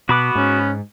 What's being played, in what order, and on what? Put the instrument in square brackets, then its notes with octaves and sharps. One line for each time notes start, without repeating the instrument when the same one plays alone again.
[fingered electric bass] B2 [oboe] B3 [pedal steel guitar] F#4 B5 D6
[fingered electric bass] G#2 [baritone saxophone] C#4